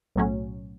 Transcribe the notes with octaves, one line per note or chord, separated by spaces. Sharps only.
B1 A2 F#3 C#4